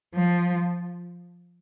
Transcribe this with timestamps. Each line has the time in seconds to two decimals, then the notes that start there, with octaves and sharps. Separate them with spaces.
0.15 F3